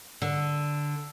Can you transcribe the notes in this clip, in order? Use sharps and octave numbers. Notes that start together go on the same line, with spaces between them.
D3